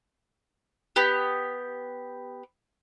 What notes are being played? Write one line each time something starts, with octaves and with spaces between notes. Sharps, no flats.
B3 G4